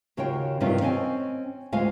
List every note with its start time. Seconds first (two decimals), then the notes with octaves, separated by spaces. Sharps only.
0.17 D#2 C#3 F4 F#4 C#5 G5
0.60 G2 C3 D#3 C#4 D#4 F4
0.81 C4 C#4 D#5 G#5
1.72 D2 G#3 F4 F5 G#5